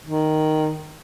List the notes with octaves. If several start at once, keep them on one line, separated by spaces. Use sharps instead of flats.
D#3